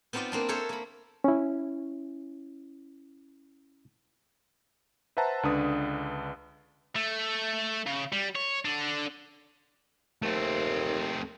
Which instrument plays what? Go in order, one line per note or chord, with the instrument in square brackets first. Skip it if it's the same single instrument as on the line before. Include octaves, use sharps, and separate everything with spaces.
[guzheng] B3 C4 D#4 F4 D5 D#5
A#3 C4 D4
A4 A#4 C5 C#5 E5
A#3 B5
[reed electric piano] C#4 E4
[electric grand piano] B4 C5 E5 F#5 A5 A#5
C#2 D3 D4 B4 D#6
[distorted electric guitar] A3
C#3
G3
C#5
D3 D4
[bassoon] D#2 [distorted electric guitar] A3 C4